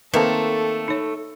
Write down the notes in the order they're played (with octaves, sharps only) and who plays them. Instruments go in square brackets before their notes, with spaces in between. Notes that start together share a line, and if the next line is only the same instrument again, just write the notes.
[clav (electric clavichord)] D#3 A#3 C4 [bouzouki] A3 [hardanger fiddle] A4 [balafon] B4 A5
[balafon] D#4 C#5